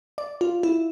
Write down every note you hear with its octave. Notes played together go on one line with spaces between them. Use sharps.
D5
F4
E4